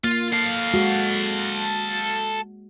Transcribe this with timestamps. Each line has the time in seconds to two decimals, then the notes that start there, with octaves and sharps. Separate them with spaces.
0.04 A#3 F4
0.32 A4 F5
0.74 G#3 F#4